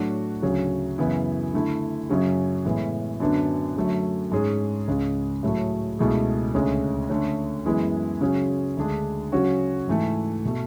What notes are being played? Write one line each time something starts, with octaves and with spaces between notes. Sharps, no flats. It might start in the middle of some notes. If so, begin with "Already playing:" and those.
Already playing: A2 F#3 A3 D4 F#4
D2 C#3 F#3
F#2 C#3 E3 B3 E4
D3 A3 E4
F#2 C#3 F#3 C#4
A2 E3 G#3 B3
F#2 D3 F#3 B3 D4
F#2 D3 F#3 A3
G#2 G#3 C#4 G#4
C#2 C#3 G#3
A2 F#3 A3
C#2 B2 A3 E4 G#4
D2 C#3 G#3 C#4
D3 A3 C#4
F#2 E3 G#3 B3 E4
C#3 F#3 C#4 G#4
D2 D3 G#3 D4 G#4
C#3 F#3 C#4 F#4
G#2 E3 A3
B2 A3